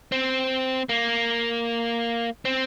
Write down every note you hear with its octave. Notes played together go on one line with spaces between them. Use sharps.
C4
A#3
C4